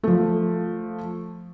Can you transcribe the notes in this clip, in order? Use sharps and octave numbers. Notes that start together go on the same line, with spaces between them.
F3 A3